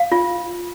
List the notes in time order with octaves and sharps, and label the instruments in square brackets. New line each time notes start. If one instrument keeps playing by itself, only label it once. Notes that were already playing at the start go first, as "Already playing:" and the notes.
Already playing: [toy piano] F5
F4